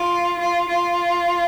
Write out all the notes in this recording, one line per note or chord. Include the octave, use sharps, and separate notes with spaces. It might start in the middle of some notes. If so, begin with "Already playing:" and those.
Already playing: F4
F4
F4